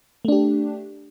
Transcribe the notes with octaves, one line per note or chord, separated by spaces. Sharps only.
A3 D4 G4